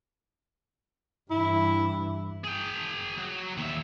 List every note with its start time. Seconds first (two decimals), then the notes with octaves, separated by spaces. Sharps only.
1.31 G2 E3 E4
2.44 G#4 G5
3.18 F#3
3.58 D#2 E5